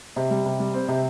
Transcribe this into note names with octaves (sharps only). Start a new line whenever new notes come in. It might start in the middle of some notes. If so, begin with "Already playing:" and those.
C3
G3
C3
G3
C4
C3